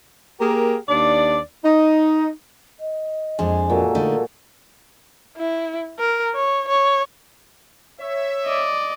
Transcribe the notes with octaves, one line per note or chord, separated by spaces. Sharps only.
A#3 G4 G#4 A#4
D#2 D4 D5
D#4
D#5
F2 G#3 D4
A#2 F#3 A4
D3 A3 D#4
E4
A#4
C#5
C#5
C#5 E5
D5 D#5